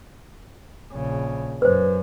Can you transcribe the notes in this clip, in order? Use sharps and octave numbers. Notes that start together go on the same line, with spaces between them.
A#1 C#3
F#2 B4 C5